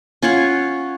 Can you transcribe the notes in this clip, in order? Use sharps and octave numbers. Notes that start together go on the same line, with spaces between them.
C#4 F4 C#5 F#5